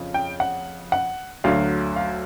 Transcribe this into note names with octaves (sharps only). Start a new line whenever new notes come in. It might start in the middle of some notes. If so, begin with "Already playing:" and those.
Already playing: F2 C#3
G5
F#5
F#5
D2 D3 F#3 F5
F5